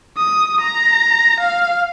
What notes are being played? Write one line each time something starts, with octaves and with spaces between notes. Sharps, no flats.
D#6
A#5
F5